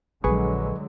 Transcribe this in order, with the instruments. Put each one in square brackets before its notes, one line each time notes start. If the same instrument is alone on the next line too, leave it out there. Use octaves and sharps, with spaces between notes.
[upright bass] A#1 [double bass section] D3 F#3 G#3 [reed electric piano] G#4 B4 C#6